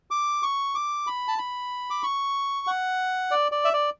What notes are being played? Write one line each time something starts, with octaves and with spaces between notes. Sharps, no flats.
D6
C#6
D6
B5
A5
B5
D6
C#6
F#5
D5
D5
E5
D5